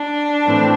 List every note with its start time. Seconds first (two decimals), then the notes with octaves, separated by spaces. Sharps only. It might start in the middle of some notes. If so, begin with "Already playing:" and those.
Already playing: D4
0.45 A2 E3 A3 C4